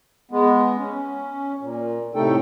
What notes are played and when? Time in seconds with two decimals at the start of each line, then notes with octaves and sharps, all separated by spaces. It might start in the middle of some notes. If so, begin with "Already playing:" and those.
0.31 G#3 B3
0.78 C#4
1.61 A#2
2.15 A2 C3 A3 D#4 A4 G5